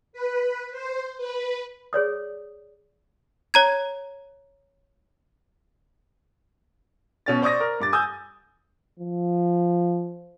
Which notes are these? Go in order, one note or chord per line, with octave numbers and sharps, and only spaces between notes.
B4
C5
B4
G#4 C#5 D5 D#6
C#5 A#5 G#6
B2 C#4 A6
C5 D5 C#6 D#6 A#6
A#4
G2 D6 A6
G#5 D#6 E6 G6
F3